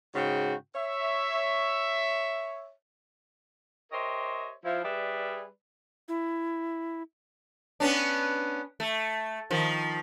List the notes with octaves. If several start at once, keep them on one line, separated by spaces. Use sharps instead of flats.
G#2 C#3 F#4 G5
C#5 E5
G4 A#4 C5 C#5 D#5 E5
F3 E4
G3 G#4 B4 D5 E5
E4
B3 C#4 D4
A3
D#3 F3